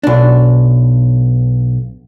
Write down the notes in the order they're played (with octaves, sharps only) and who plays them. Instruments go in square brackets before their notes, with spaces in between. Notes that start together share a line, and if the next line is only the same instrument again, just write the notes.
[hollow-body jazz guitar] B1 D4